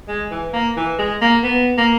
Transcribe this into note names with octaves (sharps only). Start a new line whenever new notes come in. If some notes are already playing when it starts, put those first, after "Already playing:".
G#3
E3
A#3
E3
G#3
A#3
B3
A#3